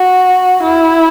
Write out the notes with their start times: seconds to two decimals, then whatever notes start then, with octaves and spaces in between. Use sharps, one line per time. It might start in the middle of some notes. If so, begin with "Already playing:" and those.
Already playing: F#4
0.63 E4